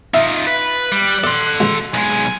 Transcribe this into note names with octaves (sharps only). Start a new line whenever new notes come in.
D#4 F4 E5
B4 F#6
G3
A4 D5 C6
C#2
B1 G#3 G#5